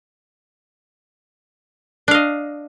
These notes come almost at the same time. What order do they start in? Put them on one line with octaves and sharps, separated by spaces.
D4 F5 D#5